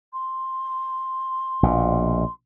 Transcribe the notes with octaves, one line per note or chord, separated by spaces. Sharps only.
C6
A#1 B2